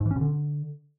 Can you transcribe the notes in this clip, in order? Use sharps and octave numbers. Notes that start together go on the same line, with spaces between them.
G#2
E3
C#4
B2
D3